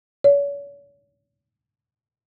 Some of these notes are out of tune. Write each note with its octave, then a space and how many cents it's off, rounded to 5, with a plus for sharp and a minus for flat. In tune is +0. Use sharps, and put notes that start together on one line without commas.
C#5 +40